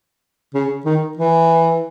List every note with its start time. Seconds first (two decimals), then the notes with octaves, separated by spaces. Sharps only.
0.54 C#3
0.86 D#3
1.17 E3